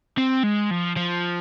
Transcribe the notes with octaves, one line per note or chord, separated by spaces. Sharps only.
C4
G#3
F3
F3